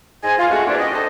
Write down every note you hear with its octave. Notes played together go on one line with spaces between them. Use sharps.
G#2 C5 D#5 G#5
F4
G#3 A3 C#4 F4 F#4
E2 G#2 A#3 C#4 D4
G4 D#5
D#4 A4 C5 D#5